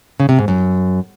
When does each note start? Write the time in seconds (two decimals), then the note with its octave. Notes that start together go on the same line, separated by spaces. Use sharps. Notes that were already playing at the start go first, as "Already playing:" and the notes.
0.20 C#3
0.29 C3
0.39 G#2
0.48 F#2